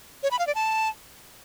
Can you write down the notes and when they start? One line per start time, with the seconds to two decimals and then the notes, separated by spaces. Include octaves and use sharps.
0.23 C#5
0.31 B5
0.39 F5
0.47 D5
0.55 A5